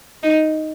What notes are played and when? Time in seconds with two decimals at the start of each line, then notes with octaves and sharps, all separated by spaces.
0.23 D#4